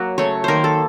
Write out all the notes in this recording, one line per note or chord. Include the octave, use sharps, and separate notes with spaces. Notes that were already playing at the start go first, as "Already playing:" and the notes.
Already playing: F#3 A#3 F#4
C#3 A3 C#5
D#3 A#3 A#4 C5
A4